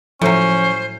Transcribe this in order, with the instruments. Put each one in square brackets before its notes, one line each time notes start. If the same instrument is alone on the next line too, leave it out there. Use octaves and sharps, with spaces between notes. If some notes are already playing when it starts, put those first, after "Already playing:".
[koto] A2 F#3 [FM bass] F3 [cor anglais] C#4 [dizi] C5